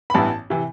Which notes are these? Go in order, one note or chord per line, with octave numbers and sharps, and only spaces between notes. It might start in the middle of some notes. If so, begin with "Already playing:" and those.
B5
A1 G2 E3 B3 E4 A5
C3 E3